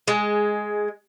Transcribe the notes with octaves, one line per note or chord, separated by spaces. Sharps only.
G#3